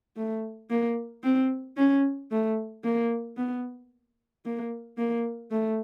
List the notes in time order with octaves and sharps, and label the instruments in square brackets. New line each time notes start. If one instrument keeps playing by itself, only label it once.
[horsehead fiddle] A3
A#3
C4
C#4
A3
A#3
B3
A#3
A#3
A3